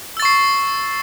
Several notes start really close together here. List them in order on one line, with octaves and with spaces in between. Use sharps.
E6 A6 C#6 C7